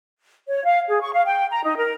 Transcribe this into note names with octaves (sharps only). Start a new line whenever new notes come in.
C#5
F5
G#4
C#6
F5
G5
A#5
D#4
A#4